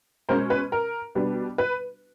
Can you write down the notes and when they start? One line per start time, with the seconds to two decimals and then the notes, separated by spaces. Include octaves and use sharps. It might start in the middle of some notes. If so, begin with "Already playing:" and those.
0.29 B2 G#3 C#4 A#4 C5
0.50 B4
0.72 A#4
1.15 B2 G3 B3 D4
1.58 B4